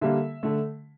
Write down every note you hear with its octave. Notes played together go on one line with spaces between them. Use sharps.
D3 G3 A#3 E5
D3 A3